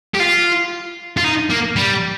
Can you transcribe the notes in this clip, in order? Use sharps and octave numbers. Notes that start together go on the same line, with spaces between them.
G4
F4
F4
D#4
A#3
G3